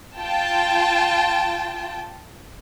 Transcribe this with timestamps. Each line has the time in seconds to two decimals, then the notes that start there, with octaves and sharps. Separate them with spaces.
0.19 F4 G5 A5